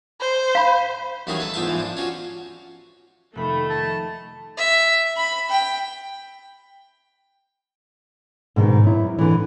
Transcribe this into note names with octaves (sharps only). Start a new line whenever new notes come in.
C5
F5 B5
D#2 E3 F#3 C#4 G#4 G#5
A4 B4
E2 G#2 F4 E5 A5
G#2 E3 F3
D4
C#4 F4 F#4
F1 D#3 A3 B5
E5 A5
E5
B5
G5
G#2 B2 D3 D#3
F#2 E4
D3 E3